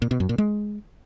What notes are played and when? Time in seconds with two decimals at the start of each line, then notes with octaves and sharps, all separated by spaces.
0.02 A#2
0.11 B2
0.20 F#2
0.29 A#2
0.38 G#3